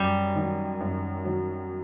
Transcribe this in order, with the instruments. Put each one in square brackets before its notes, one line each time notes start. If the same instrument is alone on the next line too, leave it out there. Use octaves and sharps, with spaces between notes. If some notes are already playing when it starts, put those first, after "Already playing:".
Already playing: [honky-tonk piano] F#2 [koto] G3
[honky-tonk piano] D#3 F#3
F#2
D#3 F#3